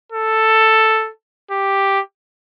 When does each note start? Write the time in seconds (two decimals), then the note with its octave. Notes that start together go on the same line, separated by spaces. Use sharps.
0.12 A4
1.51 G4